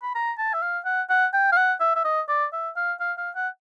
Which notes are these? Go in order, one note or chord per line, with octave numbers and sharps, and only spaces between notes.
B5
A#5
A5
E5
F5
F#5
F#5
G5
F5
F#5
E5
E5
D#5
D5
E5
F5
F5
F5
F#5